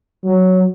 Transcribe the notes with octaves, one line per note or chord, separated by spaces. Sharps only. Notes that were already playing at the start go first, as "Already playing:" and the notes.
F#3